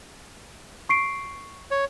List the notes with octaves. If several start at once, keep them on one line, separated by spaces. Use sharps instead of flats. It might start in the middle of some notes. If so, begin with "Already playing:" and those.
C#6 C7 D7
C#5